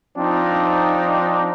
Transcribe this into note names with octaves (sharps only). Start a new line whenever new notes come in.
F3 C4 D4 D#4